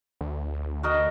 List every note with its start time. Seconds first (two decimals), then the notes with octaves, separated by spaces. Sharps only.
0.21 D2
0.83 F#4 A#4 D#5